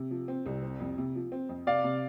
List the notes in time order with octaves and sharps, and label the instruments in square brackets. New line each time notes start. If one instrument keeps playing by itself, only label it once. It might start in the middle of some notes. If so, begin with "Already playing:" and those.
Already playing: [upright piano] C3
F3
C4
C2
C4
F2
C3
F3
C4
F2
[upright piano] C3 [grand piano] D5 F5
[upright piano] C3